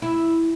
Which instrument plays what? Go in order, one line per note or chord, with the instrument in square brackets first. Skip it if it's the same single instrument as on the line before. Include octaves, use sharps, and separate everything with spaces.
[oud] E4